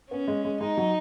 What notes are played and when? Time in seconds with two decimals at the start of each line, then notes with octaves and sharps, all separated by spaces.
0.11 B3 C#4
0.28 G#3
0.45 G#3
0.61 G#3 D#4
0.77 F#3